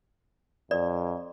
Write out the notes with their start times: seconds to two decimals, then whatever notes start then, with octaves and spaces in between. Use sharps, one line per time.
0.71 F2 D5